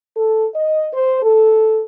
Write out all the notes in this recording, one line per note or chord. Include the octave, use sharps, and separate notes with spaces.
A4
D#5
C5
A4